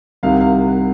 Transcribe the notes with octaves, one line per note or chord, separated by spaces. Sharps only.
C2 C3 D#3 F5
F#5
F5
F#5